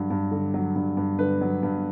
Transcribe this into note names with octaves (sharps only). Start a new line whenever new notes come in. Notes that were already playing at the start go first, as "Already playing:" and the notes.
Already playing: G2 D3 F#3
G2
D3
F#3
G2
G2
D3 B4
F#3
G2